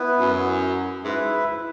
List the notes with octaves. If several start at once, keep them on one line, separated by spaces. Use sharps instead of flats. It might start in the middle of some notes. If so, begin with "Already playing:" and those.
Already playing: B3 E4 B4
F#2
G#2 E4 B4 E5